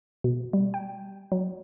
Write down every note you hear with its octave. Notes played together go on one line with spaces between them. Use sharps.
B2
G3
G5
F#3